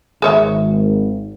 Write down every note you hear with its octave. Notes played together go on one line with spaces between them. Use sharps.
G#1 G#4 C#5 E5